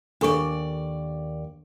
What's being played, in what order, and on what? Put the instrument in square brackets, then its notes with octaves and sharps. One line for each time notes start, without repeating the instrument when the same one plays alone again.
[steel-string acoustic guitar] D#2 D5 [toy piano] D4 A4 C#6